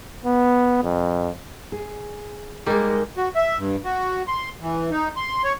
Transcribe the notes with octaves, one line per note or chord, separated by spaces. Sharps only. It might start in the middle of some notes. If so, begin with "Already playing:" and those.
B3
F2
G#4
G3 G#3 A#3 D#4 G#4 A#4
F#4
E5
G2
F#4
C6
E3
D#4
C6
C#5